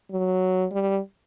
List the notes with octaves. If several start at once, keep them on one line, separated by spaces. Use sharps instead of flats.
F#3
G3